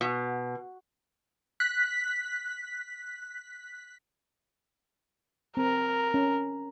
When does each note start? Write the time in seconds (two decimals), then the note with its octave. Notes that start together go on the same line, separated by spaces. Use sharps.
0.01 B2
1.60 F#6 B6
5.57 C4 A#4
6.14 C#4